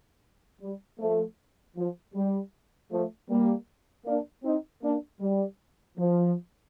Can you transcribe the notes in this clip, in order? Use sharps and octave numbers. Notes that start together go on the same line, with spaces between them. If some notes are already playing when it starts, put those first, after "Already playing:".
G3
F3 A3
F3
G3
F3 A3
G3 A#3
A#3 D4
C4 D#4
A#3 D4
G3
F3